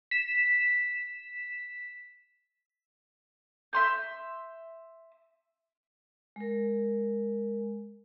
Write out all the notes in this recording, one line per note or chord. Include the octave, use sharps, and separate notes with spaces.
B6 E7
E5 C6 G6
G#3 A#4